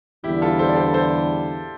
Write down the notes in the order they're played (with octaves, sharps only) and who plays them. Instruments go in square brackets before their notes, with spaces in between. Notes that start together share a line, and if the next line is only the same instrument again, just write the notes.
[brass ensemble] E2 D3 G3 [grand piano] E4 G4
[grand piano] F4 A4
A4 C5
D5
A4 C5
A4 C5